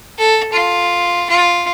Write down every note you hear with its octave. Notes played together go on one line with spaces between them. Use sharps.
A4
F4
F4